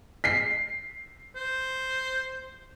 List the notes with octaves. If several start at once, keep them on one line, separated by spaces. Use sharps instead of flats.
B6 C7
C5